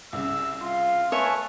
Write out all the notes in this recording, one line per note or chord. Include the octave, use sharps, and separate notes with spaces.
C2 C#3 E6
F4 F5
A3 B4 C#5 E5 G#5